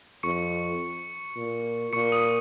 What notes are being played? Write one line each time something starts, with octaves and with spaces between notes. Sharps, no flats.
F2 C#6 C#7
A#2
A#2 C#6 C#7
D#6 D#7